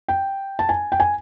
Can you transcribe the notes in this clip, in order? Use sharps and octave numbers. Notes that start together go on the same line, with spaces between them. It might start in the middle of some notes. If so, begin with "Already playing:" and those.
G5
A5
G#5
G5
G#5